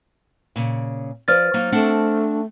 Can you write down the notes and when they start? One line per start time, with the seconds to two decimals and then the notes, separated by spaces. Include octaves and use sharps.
0.56 A#2 C#3
1.28 F3 B4 C5 D5 F6 A6
1.54 F#3 A#3 D#4
1.72 A3 C4 D4 F#5